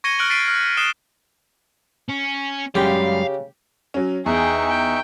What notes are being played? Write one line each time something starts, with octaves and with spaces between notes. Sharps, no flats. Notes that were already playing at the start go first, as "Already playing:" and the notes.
C#6 G#6 A#6 C#7 D#7 G7
F6 F#6 D7 F#7 G7
A6 B6 C7 D7 D#7
F6
D#6 F#6 C7 E7 G7
C#4
F#2 C#3 G3 G#3 G4 F5
F#3 C#4
E2 D#4 G#4 E5 G5 C#6
G5